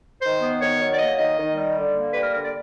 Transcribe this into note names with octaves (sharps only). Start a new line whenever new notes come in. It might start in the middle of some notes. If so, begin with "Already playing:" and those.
D#3 C5
B3
D#3 C#5
F#3
D5
A#3 D#5
D#3 D#5
D#3
G3
D3
A#3
G3 B4
A#4
D3 A#4
D5